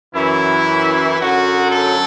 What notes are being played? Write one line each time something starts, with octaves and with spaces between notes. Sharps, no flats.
F#2 E3 E4
F#2 D3 F#3 F#4
A4